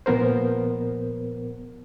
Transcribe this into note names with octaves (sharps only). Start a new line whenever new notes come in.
A#2 F3 B3 A#4 C5